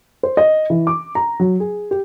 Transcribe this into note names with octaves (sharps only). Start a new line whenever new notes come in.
C5
D#5
E3
D6
A#5
F#3
G#4
G4